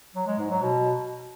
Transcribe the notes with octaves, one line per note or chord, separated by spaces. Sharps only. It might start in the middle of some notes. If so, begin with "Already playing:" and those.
F#3
G#3
G#2
F#3
B2